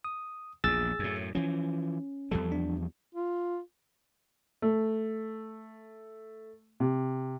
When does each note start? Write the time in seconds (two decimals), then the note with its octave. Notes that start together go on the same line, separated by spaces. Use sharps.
0.05 D#6
0.64 A#1 E2 G#4 E6 A6
0.99 F#2 A2
1.35 E3 F3 C#4
2.31 E2 F3 G3 A4
2.52 D4
3.15 F4
4.62 A3
6.80 C3